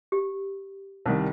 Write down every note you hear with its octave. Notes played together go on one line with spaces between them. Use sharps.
G4
C2 D#3 G3